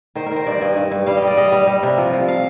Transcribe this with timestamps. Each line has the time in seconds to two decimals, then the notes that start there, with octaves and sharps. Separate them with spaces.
0.15 D#3 C5
0.26 A#4
0.31 D#3 C5
0.47 G2 D5
0.61 G2 D#5
0.77 G2
0.91 G2
1.06 G3 F5
1.17 D#5
1.22 G3 D5
1.37 G3 D#5
1.52 G3
1.67 G3
1.83 C3
1.98 F3
2.13 F3
2.28 F5